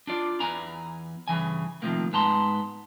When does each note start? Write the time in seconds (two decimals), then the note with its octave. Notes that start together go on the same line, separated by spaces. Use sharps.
0.07 D4 F4 D5
0.40 E2 E3 D5 G#5 A#5
1.28 G2 C#3 E3 G#5
1.82 C3 D#3 F3 A3 A#3
2.13 G#2 B3 A5 A#5 C6